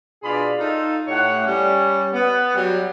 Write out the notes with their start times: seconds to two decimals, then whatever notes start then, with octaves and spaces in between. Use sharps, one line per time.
0.23 B2 D4 F4 G#4 D5 B5
0.58 D#4 F4 A4
1.08 A2 A3 G4 C#5 F#5
1.44 G3 C#4
2.13 B3
2.55 F#3 G3